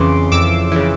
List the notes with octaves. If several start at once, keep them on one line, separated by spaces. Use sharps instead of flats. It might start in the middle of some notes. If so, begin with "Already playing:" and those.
Already playing: F2 C#3 E3 C6 D6
F2 D6 E6
C#3 E3